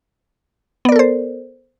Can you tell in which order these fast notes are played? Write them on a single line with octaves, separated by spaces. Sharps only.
B3 D5 A#4 A4 C5